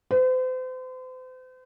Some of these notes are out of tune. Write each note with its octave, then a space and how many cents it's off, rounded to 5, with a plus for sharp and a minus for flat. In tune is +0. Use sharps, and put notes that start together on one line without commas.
C5 -40